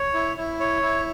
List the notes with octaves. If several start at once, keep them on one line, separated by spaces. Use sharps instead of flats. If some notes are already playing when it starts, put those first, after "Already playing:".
Already playing: C#5
E4
E4
C#5
E4